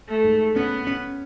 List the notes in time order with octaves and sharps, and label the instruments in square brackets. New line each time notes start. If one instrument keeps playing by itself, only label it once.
[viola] A3
[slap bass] G#2
[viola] B3 [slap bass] C#4
[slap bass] C#4